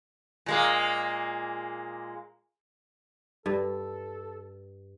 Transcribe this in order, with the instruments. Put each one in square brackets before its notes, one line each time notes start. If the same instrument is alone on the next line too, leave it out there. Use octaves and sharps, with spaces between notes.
[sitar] A#2 G#3 A#3
[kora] G2 [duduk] A4